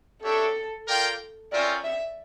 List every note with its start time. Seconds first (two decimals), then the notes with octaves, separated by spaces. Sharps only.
0.22 D4 G4 A4 C#5 E5 G5
0.87 F4 A#4 D5 G5
1.52 C#4 F4 A#4 D5 E5 G5
1.84 E5